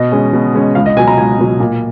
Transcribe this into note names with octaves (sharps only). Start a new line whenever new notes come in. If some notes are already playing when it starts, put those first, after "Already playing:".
Already playing: B2 D#5
G#3 C#4
B2
G#3 C#4
C#2 F5
D#5
B2 F#3 G#5
A#5
C#2 G#5
B2 F#3
A#2